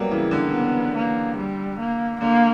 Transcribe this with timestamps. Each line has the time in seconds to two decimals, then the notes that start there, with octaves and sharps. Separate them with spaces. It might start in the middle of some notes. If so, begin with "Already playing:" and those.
Already playing: F#3 G3 A#3 B3
0.11 C#3 E3 E4
0.31 D3
0.53 B3
0.95 A#3
1.37 G3
1.79 A#3
2.21 D3 A#3